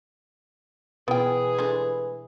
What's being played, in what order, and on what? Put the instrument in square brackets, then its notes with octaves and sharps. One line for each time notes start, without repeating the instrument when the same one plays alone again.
[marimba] B2 F4 [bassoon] E3 [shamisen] B3 G5 [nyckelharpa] G#4
[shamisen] G#3 A3 D4